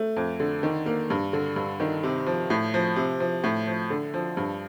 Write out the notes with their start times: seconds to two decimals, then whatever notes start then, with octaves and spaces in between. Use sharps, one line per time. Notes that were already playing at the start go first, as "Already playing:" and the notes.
Already playing: A3
0.17 F2
0.40 D3
0.63 D#3
0.86 A#3
1.10 G2
1.33 D3
1.56 G2
1.80 D#3
2.03 C3
2.26 F3
2.50 A2
2.74 F3
2.96 C3
3.20 F3
3.44 A2
3.67 F3
3.90 D3
4.14 F3
4.37 G2